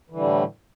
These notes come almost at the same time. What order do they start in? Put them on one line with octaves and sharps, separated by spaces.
E3 D3 G3 A2